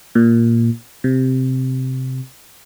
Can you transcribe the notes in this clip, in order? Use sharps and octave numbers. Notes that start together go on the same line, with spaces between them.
A#2
C3